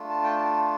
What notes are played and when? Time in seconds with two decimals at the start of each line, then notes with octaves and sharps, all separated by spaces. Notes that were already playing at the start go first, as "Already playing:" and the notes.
Already playing: A3 D4 F4
0.10 A5
0.24 G5
0.36 A5